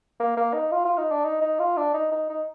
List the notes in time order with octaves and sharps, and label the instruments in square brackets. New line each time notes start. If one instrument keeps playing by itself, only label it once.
[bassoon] A#3
A#3
D#4
F4
F4
D#4
D4
D#4
D#4
F4
D4
D#4
D#4
D#4